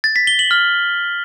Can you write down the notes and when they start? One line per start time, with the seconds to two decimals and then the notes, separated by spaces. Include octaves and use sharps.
0.04 A6
0.16 B6
0.27 G7
0.39 F#7
0.51 F6